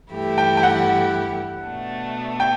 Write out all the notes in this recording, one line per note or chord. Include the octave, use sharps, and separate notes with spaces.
G2 E3 A3 E4 G4
G5
G5
F#5
B2 A3 D4
G5